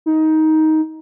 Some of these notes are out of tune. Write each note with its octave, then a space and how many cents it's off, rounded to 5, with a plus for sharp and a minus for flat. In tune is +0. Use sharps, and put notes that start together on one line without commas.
D#4 +15